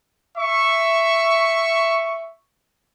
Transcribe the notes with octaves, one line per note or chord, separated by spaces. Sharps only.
E5 C#6